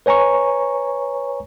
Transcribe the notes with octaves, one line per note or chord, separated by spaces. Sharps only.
B4 C#5 G#5 A#5 C#6